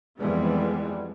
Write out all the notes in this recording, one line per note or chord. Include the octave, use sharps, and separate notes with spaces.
F2 E3 G3 G#3 B3